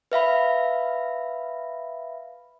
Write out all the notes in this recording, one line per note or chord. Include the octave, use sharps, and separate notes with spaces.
B4 E5 F5 B5